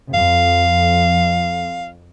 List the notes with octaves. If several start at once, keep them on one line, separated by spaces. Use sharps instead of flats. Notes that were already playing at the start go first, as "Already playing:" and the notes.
F2 F5